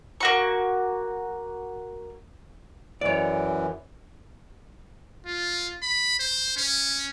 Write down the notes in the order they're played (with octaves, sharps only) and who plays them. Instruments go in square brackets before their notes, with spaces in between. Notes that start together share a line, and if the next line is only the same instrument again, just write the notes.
[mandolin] A#3 F#4 C#6
[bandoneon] F#2 E3 [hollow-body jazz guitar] C#5 D5
[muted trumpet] F4
B5
C5
C#4